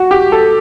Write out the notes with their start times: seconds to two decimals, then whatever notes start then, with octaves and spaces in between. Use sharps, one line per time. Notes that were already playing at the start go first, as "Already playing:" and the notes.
Already playing: F#4
0.11 G4
0.32 A4